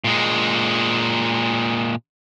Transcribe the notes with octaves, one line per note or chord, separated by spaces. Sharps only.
A#2 G#3